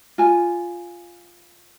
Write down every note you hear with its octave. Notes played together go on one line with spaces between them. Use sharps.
F4 G#5